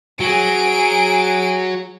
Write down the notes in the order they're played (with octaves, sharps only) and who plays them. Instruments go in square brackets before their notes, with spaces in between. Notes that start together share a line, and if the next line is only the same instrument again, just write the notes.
[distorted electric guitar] F#3 [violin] G#4 D7